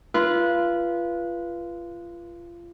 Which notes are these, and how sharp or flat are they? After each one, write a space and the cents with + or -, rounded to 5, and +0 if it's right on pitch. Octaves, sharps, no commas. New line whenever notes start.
F4 -25 B4 -20